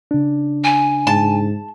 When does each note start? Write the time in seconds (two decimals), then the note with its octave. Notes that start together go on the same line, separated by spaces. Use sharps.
0.11 C#3 D4
0.64 G#5
1.07 G#2 A5